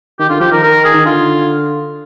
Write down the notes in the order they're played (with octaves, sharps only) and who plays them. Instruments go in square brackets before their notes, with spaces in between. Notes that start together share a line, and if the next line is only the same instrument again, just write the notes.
[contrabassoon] D#3 [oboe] G4
[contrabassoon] D3 [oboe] F4
[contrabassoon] F3 [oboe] G4
[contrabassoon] D#3 [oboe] A#4
[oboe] A#4
G#4
[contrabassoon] D#3
[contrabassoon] D3 [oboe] F4